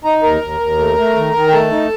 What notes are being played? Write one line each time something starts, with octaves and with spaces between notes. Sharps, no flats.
D#4 A#5
D#2 A#4 A#5
D#2
D#2
A3
A3
D#3
D#3
G5
A3 A4 A5
D#4